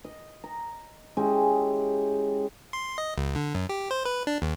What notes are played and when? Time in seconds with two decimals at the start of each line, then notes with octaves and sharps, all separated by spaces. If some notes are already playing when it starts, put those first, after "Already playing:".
0.04 D#5
0.44 A#5
1.17 G#3 C#4 E4 G4
2.73 C6
2.98 D#5
3.18 C#2
3.36 D3
3.55 F#2
3.69 G4
3.91 C5
4.05 B4
4.27 D4
4.42 D#2